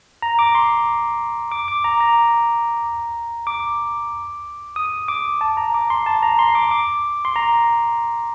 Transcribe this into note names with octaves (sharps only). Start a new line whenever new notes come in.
A#5
D6
C6
D6
D6
A#5
A#5
D6
D#6
D6
A5
A#5
D6
C6
A5
A#5
C6
D6
D6
C6
A#5